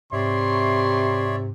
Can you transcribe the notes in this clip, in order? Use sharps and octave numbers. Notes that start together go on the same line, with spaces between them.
G#2 C3 C#5 D5 E5 C6